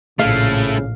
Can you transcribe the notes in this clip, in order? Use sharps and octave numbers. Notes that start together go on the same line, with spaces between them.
A#1 A2 C#3 A3 E4 F5